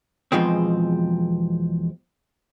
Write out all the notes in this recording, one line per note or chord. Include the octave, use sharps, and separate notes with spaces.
E2 B2 F3 G#3 C4